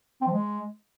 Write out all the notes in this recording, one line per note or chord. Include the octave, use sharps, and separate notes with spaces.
C4
F3
G#3